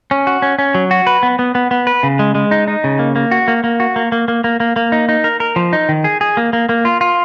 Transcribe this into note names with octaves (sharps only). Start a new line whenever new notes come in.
C#4
F#4
C#4
C#4
F#3
F#4
B4
B3
B3
B3
B3
B4
C#3
G#3
G#3
D#4
D#4
C#3
A#3
A#3
F#4
A#3
A#3
F#4
A#3
A#3
A#3
A#3
A#3
A#3
D#4
D#4
A#4
A#4
F3
D#4
D#3
G#4
G#4
A#3
A#3
A#3
F4
F4